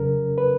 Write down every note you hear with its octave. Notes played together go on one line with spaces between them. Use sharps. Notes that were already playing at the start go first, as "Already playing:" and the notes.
Already playing: F2 C#3 F#3 C#4 A#4
B4